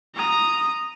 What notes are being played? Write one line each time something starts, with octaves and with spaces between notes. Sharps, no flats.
A#5 D#6